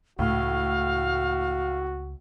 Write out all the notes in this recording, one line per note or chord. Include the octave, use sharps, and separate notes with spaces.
C#2 A2 F#4 F5